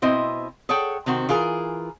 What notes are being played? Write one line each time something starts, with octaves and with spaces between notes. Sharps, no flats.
B2 C4 E4 C5 D#5
G#4 A4 C#5 F#5 G5
C3 D#3 C4 F#4
E3 F4 G#4 A#4